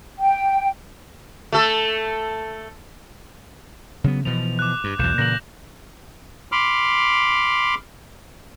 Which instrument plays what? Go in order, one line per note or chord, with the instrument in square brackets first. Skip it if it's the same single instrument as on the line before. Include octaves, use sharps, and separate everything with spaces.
[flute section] G5
[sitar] A3 A4
[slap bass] C#3 F#3 B3
[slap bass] B2 E3 F3 [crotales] F7
[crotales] D6 F#6
[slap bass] G2
[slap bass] B1 E2 [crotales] G6 E7
[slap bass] A#2 C#3 E3 [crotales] A#6 F#7
[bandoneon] B5 C6 D6 F6